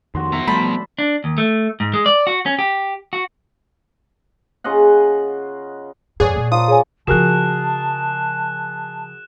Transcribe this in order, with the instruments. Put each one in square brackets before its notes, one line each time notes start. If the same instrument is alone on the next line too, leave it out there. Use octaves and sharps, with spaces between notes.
[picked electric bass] F2 D#3 [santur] F#4 C6
[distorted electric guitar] B2 A#5 [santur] E5
[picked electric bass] F3 G3 A3 [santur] C5 D5 A5 [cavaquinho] B5
[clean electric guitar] D4
D#2
A3
G#2
G#3
D5
F#4
C#4
G4
F#4
[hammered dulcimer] C#3 F4 D#5 F#5
[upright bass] F2 G#2 [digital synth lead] G#4 [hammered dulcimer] C#5 D5 F#5
[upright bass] A#2
[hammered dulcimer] F3 A#3 C6 [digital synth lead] D#6
[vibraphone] G#4 C#5 G#5
[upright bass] C#3 F3 [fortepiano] F#4 G#4 A#4 [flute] A5 [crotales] F#6 E7